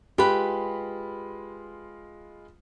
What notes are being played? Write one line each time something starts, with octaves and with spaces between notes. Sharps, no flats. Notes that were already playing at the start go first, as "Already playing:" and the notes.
G#3 F4 G4 B4 B5